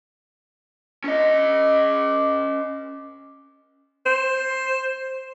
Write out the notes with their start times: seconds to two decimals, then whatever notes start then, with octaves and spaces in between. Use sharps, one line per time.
1.04 C#4 D#5
4.06 C5